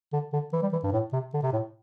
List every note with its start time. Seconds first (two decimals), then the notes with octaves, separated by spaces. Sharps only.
0.13 D3
0.33 D3
0.53 E3
0.62 G3
0.73 E3
0.83 G2
0.92 A2
1.13 C3
1.34 D3
1.43 C3
1.53 A2